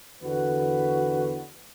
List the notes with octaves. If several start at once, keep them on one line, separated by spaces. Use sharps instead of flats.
E2 D3 F#4 B4